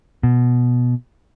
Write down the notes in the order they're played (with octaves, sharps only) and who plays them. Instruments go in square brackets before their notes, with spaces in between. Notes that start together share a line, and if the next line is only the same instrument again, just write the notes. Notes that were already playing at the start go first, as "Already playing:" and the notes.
[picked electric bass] B2